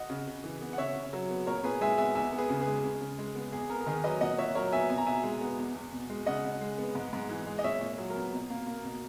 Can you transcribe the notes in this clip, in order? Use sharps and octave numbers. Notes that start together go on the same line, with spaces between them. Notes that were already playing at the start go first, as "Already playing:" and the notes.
Already playing: D#5 F#5
C#3
C#3
E3
B3
F#5
C#3 C#5 E5
C#3
F#3
B3
A#2 A#4 C#5
A#2 G#4 B4
G#3 E5 G#5
B3 E5 G#5
E2 E5 G#5
B3
G#4 B4
C#3
G#4 B4
G#3
C#3
C#3
G#3
B3
E2 G#4
B3 A#4
A#4
D#3 G#4 B4
F#3 B4 D#5
A#2 D#5 F#5
A#2 C#5 E5
F#3 A#4 C#5
B3 E5 G#5
B2 G#5
A#5
B2 E5 G#5
G#3
B3
E2
E2
B2
G#3
C#3 D#5 F#5
C#3
G#3
B3
G#2
G#2
E3
G#3
D#5
A#2 C#5 E5
A#2
F#3
A#4
B3
B2
A#3
A#3
B2